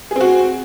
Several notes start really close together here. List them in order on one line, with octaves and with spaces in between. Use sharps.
G#4 C4 F#4